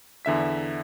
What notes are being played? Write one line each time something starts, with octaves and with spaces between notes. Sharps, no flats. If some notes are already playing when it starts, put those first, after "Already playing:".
E2 D3 E5 B6